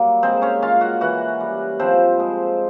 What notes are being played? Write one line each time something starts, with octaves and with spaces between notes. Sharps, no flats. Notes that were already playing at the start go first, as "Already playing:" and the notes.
Already playing: F#3 G3 A#3
G#3 C4 C5
C#4 C#5
C#4 F4 F5
F#4 F#5
E3 F#4 F#5
G3
F3 C4 C5
G#3